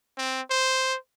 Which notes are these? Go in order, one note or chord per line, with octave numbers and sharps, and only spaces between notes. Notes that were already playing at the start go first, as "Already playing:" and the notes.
C4
C5